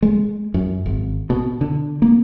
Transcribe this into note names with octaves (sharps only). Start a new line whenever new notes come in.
G#3
F#2
G#1
B2
D3
A#3